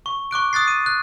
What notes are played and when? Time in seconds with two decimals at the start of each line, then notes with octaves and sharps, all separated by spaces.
0.06 C#6
0.31 C#6 D6 F#6 D7
0.53 D#6 F#6 A6 C7
0.68 D#7
0.86 F#6